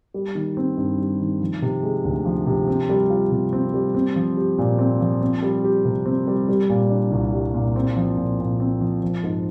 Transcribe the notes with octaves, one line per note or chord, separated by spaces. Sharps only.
G3
D#3
C4
G2
G3
D#3
F3
C3
G#3
D2
F3
C3
C4
G3
F4
C3
C4
G3
C4
F3
G4
A#2
C4
F3
C4
G3
G4
C3
C4
G3
G3
A#2
D4
C2
G3
A#2
C4
F3
A#2
A#2
C4
F3
F3
G#2